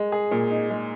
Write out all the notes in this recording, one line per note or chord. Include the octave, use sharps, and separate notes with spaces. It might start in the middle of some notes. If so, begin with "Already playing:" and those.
Already playing: G#3
G#4
A#2
D#4
G#3